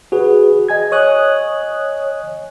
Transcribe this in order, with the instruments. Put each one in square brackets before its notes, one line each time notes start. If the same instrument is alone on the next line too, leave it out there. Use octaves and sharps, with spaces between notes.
[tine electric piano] F#4 G#4 B4
D#5 G#5 G#6
[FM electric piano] C#5 D#6 F#6